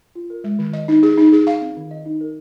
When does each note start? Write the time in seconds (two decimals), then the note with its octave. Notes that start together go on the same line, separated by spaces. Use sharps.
0.15 F4
0.30 A#4
0.44 G#3
0.59 D#3
0.73 D#5
0.88 D#4
1.03 G#4
1.18 D#4
1.32 G#4
1.47 F5
1.62 C4
1.77 D#3
1.91 D#5
2.06 D#4
2.21 A#4